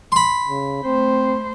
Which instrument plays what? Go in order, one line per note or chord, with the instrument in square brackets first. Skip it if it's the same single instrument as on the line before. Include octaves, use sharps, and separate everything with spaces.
[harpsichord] B5 C6
[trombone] C#3
[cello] A3 C5 [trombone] C4